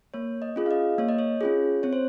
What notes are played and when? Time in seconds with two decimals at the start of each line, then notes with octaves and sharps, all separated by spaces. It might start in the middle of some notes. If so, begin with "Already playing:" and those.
0.14 A#3 C#5
0.42 D#5
0.56 C#4 F4 G#4
0.66 F5
0.71 D#5
0.98 A#3 C#5
1.09 D#5
1.19 C#5
1.41 C#4 F4 G#4
1.83 C4 C#5
1.93 C5